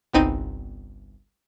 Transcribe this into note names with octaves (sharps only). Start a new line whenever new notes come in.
G1 C2 B3 C4 D#4 D#7